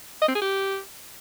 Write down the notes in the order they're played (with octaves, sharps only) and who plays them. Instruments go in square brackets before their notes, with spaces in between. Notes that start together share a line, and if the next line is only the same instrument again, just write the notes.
[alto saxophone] D#5
C4
G#4
G4